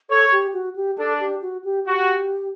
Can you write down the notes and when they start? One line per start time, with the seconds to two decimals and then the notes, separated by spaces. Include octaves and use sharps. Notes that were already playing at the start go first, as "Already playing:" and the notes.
0.10 A4 C#5
0.32 G4
0.54 F#4
0.76 G4
0.98 D4 A4
1.20 G4
1.42 F#4
1.64 G4
1.86 F#4 G4